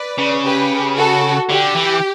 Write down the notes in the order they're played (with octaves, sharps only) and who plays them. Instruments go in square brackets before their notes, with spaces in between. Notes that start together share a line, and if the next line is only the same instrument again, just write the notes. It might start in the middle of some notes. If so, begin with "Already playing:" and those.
Already playing: [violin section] B4 D5
[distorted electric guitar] C#3
[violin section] G4 B4
F#4 A4
[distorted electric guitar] D3 [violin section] G4
[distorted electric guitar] E3